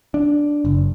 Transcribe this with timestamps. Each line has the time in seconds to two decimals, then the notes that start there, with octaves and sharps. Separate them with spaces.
0.14 D4
0.65 F#1